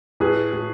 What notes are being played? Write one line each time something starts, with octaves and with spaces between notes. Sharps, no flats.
A2 G#4 B4
A2